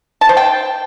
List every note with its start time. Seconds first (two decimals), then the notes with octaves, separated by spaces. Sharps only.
0.21 A5
0.29 C5
0.37 G5